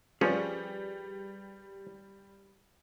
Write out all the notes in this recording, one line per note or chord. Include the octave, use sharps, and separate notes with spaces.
F3 G3 C#4 G#4 B4 D5